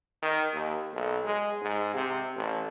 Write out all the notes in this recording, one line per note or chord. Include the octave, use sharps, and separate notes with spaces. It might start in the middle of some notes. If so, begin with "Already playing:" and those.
D#3
D#2
B1
G#3
G#2
C3
A1